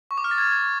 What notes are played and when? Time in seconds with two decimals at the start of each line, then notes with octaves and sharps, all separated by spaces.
0.11 C#6
0.18 D6
0.24 F6
0.31 A6
0.38 G#6